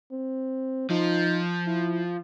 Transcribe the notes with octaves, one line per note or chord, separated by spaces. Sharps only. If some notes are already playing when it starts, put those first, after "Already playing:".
C4
F3 D#4
E4